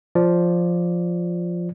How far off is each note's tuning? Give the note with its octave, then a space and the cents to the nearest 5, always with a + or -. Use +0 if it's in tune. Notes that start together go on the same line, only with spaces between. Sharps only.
F3 +0 D5 +0